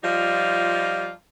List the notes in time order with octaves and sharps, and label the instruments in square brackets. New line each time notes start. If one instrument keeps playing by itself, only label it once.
[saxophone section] F3 G3 D#4 F4